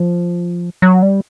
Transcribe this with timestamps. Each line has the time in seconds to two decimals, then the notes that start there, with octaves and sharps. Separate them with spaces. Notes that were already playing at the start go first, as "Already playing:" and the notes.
Already playing: F3
0.82 F#3
1.02 G3